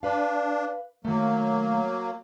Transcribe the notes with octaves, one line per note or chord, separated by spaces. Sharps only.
D4 B4 F5
D#3 F#3 A3 A#3